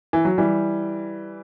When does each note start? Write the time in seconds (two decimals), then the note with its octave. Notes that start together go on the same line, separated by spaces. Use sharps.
0.13 E3
0.25 F#3
0.38 E3 G3